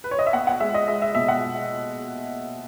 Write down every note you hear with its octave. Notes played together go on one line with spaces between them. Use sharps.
B4
C#5
D#5
E5
B3 F#5
F#5
G#3 E5
D#5
G#3 E5
E5
B2 E5
F#5